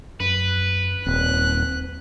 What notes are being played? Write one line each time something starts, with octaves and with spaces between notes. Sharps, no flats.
F#2 B4
D#1 C4 F#6